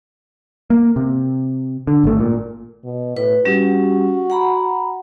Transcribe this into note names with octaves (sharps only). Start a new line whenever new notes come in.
A#3
C3
D3
G#1 A3
A#2
B2
A2 B4
G3 C#4 F#4 G4
F#5 A#5 B5